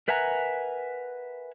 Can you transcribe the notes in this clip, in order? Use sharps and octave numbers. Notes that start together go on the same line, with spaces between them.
A#4 B4 E5 F#5 G#5 A#5